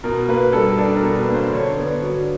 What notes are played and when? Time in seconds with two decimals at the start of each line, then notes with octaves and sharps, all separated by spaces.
0.03 B2 A#4
0.28 A#3 B4
0.53 G3 A4
0.79 D4 A4
0.96 A#4
1.03 B2
1.16 B4
1.28 A#3
1.34 C5
1.53 D3 C#5
1.77 B3
1.90 D5
2.02 F#3